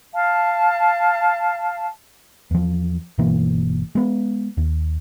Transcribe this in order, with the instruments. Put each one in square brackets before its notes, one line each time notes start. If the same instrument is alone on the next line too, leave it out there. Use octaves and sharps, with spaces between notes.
[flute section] F5 A5
[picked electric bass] E2 F3
G1 B2 E3 A#3
G#3 B3
D#2